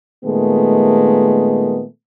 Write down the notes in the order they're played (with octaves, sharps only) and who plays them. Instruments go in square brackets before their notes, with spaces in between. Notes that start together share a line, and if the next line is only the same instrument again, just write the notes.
[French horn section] A#2 D#3 G#3 A3 B3